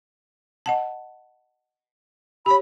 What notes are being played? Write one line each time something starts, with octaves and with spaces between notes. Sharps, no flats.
D#5 F#5 A5
G4 C#5 B5